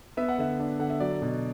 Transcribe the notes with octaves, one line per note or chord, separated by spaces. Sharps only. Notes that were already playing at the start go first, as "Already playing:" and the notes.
B3 E5
F#5
D3 E5
D4
D3 F#5
E5
F#3 D5
B2